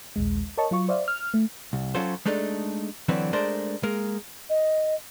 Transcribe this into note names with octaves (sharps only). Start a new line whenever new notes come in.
A#1 D#2 G#3
A#4 C#5 D#5 A5 C#6
F#3 F4 C#6
C5 D5 E5 F5
F6
A3
C2
F#3 C#4 F4 A4 C5
G#3 A3 D4 D#4 A4
D3 E3 F#3 C4 B4
G#3 A3 D4 A#4 C5 D5
G#3 A#3 A#4
D#5